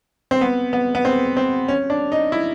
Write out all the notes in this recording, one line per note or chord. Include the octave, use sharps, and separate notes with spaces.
C4
B3
B3
B3
C4
C4
C#4
D4
D#4
E4